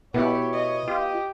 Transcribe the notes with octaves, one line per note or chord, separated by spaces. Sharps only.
B2 B3 E4 G4 C#5
D#5
F4 G4